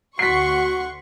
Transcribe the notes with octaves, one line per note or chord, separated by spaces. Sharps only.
D2 F#4 F#5 C6 C#6 B6 C7